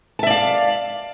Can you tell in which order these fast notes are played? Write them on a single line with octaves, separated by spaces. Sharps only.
A5 E5 D5 F5